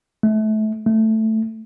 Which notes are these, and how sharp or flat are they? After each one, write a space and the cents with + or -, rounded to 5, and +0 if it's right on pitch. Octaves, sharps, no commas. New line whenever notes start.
A3 -25
A3 +5